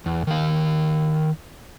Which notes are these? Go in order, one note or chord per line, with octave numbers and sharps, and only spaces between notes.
E2
D#3 F5